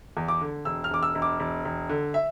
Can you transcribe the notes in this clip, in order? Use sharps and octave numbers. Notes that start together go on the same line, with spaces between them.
E2
D6
D3
E1 E6
F6
E1 D6
E6
E1
D6
E1
E1
D3
E5